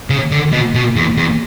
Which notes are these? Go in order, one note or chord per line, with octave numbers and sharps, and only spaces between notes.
C#3
D3
B2
B2
E2
E2